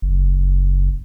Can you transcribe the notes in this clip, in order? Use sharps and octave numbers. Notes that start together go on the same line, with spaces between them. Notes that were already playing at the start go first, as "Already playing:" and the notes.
F#1